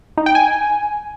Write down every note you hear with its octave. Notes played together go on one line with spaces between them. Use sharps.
D#4
G5
G#5